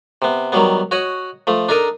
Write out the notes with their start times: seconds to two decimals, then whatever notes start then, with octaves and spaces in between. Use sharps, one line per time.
0.22 C3 B3
0.52 D#3 F#3 G3 B3
0.91 F#4 C#5 D#5 F#5
1.47 F3 A3
1.69 D4 D#4 A4 A#4 D#5